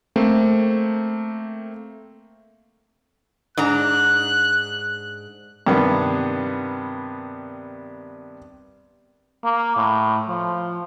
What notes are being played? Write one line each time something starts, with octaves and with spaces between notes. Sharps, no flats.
A3 A#3 C4
G#2 D4 A#5 F#6
G2 C3 D#3 B3
A#3
A2
F3